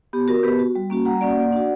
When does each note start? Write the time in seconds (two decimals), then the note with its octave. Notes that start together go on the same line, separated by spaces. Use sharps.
0.13 B3 G4
0.28 F#4 A#4
0.43 B3 G4 B4
0.59 F#4
0.75 G3
0.90 A#3 C#4 F#4
1.05 G3 F#5 A#5
1.21 A#3 C#4 F#4 D5 F#5
1.36 A#3
1.52 D4 F#4